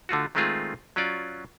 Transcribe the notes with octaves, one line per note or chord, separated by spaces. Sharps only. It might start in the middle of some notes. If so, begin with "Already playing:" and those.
D3 A3 F4 F#4
D#3 G#3 A3 C4 F4 G#4
F#3 C#4 F4 D5